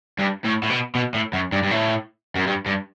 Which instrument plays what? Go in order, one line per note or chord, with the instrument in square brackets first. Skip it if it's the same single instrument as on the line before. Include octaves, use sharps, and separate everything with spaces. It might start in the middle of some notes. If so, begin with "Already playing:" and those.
[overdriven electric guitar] G2
A2
A2
B2
B2
A2
F#2
G2
G2
A2
F#2
G2
G2